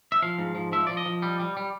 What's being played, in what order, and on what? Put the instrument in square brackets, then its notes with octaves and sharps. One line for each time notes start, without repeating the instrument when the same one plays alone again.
[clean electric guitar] E5
F3 F5
G#2
F3
F3 E5
F3 D5
D#5
F3
G3
G3
G3